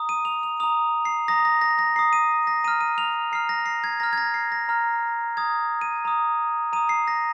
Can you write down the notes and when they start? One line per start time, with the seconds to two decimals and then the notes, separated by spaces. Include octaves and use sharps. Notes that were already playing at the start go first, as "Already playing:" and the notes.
Already playing: A#5 D#6
0.09 D#7
0.25 F7
0.43 F7
0.60 A#5 D#6 F7
1.05 C7
1.28 A#5 D#6 A#6
1.45 A#6
1.61 A#6
1.79 A#6
1.96 A#5 C7
1.99 D#6
2.13 D#7
2.47 A#6
2.64 A#5 D#7
2.68 F6
2.81 D#7
2.98 F7
3.32 A#5 F6 C7
3.49 A#6
3.66 C7
3.84 G#6
4.00 A#5 F6 A#6
4.13 G#6
4.18 A#6
4.34 C7
4.52 A#6
4.69 A#5 F6
5.37 A#5 D#6 G#6
5.81 D#7
6.05 A#5 D#6
6.73 A#5 D#7
6.76 D#6
6.89 C7
7.08 A#6